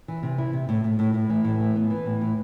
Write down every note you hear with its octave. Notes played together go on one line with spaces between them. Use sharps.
E3
C3
E4
C3
A2
A2
A2
A2
E3
A2
E3
B3
E3
A2
E3